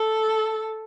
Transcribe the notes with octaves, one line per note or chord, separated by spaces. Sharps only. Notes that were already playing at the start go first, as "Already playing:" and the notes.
Already playing: A4